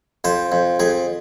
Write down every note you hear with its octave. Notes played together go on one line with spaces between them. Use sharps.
F2 C5
F2
F2 G#4